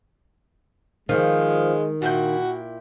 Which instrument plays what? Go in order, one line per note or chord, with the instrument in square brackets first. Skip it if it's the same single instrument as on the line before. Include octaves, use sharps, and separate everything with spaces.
[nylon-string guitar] D#3 [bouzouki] F3 [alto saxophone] G#3
[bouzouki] A#2 E4 G5 [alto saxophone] F#4